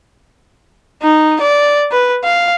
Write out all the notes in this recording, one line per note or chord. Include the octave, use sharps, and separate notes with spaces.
D#4
D5
B4
F5